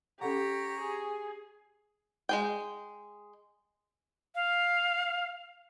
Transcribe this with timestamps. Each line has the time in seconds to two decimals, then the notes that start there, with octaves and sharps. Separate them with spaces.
0.21 C#4 G4 A4 C#5 F#5 A#5
0.80 G#4
2.29 G#3 G#4 G5
4.35 F5